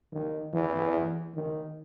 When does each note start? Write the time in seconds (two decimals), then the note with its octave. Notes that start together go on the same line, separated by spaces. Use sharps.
0.13 D#3
0.54 E3
1.35 D#3